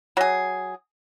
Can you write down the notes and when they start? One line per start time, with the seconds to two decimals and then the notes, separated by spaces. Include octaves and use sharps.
0.17 F#3 G#4